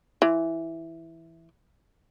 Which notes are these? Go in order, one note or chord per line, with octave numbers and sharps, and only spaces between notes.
E3